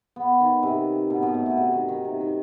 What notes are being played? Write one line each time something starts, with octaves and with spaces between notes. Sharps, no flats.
B3
D#3
C3
B2
B2
A2
B2
C3
D#3
D#3
C3
D#3